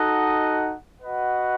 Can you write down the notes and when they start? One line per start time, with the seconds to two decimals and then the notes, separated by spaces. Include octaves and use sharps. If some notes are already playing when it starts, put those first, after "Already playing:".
Already playing: D#4 F#4 A4 D#5 F#5
1.01 F#4 B4 D#5 F#5